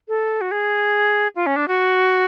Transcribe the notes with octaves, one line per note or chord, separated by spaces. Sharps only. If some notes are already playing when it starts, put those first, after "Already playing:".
A4
F#4
G#4
F4
C#4
D4
F#4